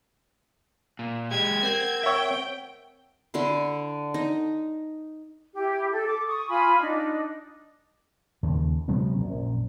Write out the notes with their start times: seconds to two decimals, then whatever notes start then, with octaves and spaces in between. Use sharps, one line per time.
0.99 A#2
1.31 G#3 G4 G#6
1.63 C4 A#4 F#5
2.03 C#5 E5 G5
3.34 D3 E4 C6
4.14 D#4
5.55 E4 G4
5.92 A4
6.06 D6
6.26 C#6 D#6
6.48 F4 G#5 B5
6.80 D4 D#4
8.43 D#2 C#3
8.88 C3 F#3 G#3 B3
9.15 A#1 F#2 A#2